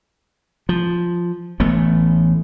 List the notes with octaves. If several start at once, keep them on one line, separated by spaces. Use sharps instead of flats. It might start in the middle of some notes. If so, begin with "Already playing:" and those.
F3
A1 E3 A3 B3